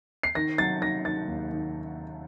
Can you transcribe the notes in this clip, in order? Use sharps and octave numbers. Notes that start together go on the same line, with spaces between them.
C7
D#3 A#6
F#3 A6
D#3 A#6
D#3 A6
D#2
D#3